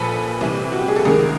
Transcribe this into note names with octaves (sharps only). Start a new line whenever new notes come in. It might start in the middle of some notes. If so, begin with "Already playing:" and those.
Already playing: A#1 A#2 F3 A4 B4
C2 C3 E3
F#4
G4
G#4
A4
C#2 C3 D#3 G#4 A#4